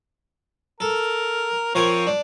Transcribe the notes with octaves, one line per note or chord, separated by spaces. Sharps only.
A4 A#4
F3 C4 A#4 C#5 G#5
D4